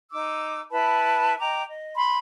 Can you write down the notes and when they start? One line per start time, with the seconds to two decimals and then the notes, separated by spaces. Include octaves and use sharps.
0.11 D#4 D6 E6
0.71 E4 B4 A5 B5
1.39 D#5 G5 A#5 D6
1.67 D#5
1.95 B5 C6